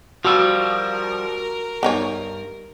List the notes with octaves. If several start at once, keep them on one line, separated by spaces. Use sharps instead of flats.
F3 G3 F#4 A#4 E6
G2 B3 D#4 C#5